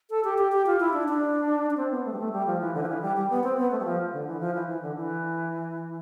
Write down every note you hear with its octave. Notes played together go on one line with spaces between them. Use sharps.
A4
G4
G4
G4
F4
E4
D4
D4
D4
C4
B3
A3
G3
A3
G3
F3
E3
D3
F3
E3
G3
G3
B3
C4
B3
A3
G3
F3
D3
E3
F3
E3
E3
D3
E3